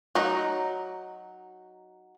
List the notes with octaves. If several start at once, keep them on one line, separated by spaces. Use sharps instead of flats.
F#3 D#4